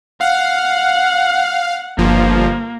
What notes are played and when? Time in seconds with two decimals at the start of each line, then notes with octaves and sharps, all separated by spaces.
0.21 F5 F#5
1.98 G1 F3 A#3